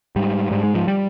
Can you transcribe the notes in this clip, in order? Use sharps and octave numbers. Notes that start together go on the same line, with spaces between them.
G#2 G3
G#2 G3
G#3
F3
G3